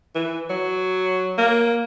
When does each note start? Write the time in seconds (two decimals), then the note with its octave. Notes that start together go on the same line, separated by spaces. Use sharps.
0.15 E3
0.50 F#3
1.38 A#3